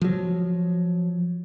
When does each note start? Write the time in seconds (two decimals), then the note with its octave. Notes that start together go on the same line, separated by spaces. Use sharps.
0.02 F3 F#3